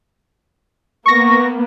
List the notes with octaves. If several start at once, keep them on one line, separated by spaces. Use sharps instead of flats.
A#3 B3 C#6 A#6